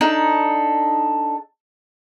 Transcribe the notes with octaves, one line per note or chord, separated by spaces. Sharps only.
D4 D#4 A4